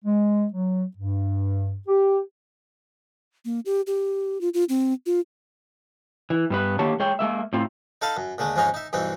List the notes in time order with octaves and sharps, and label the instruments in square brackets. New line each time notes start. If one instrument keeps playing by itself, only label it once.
[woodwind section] G#3
F#3
G2
G4
[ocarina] A#3
G4
G4
F4
F4
C4
F4
[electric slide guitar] E3
G2 B3 B4
D3 D#3 A#3 G4 C#5 A5
G#3 G#4 C#5 G5
G#3 A#3 E5
A2 C4 F4
[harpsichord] D#4 A4 D#5 F5 A5 B5
F#2
D#2 D3 G#3 A3
F2 G#2 G#3 C#4 D#4 A#5
D#4 E5
B1 G2 E3 C4 D#4